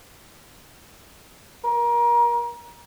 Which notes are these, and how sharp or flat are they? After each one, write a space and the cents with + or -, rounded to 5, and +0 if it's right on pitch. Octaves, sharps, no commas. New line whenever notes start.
A#4 +30